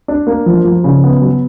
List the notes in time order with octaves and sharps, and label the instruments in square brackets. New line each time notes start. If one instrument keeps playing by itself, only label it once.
[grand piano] D4
A#3
F3
F3
C#3
B3
F#3